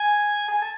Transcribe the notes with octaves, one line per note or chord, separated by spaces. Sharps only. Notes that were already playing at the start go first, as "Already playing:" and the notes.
Already playing: G#5
G#5
A5